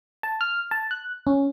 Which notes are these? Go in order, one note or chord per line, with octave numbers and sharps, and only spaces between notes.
A5
F6
A5
F#6
C#4